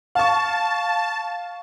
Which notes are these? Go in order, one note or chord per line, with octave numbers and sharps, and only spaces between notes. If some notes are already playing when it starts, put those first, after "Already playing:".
F5 A5 C#6